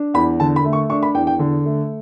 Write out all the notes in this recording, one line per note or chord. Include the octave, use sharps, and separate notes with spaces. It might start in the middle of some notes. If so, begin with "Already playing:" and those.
Already playing: D4
E2 B5
D3 A5
B5
A3
C#6
D4 C#6
B5
E2 G5
G5
D3
A3